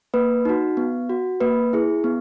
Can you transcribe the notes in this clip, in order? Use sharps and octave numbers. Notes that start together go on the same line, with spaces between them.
A#3 B4
D#4 F#4
B3
F#4
A#3 B4
E4 G#4
B3